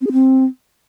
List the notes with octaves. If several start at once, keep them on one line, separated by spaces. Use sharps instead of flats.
C4
G#4
C4